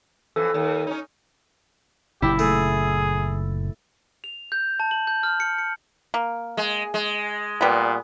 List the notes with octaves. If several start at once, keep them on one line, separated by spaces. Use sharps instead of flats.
F2 E3 A4
D#2
C#4 D#4
F#1 F#2 A#2 E4 G4
A3 G#4
F7
G6
A5
F#7
G6
F6
C#7
C#7
A#3
G#3
G#3
A#2 G3 B3